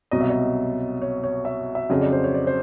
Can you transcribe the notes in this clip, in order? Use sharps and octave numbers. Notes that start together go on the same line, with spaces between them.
C2 B2 F#3 D#5
E5
D#5
C#5
C#5
E5
E5
F2 C#3 F#3 D#5
D5
C5
C#5
D5
C5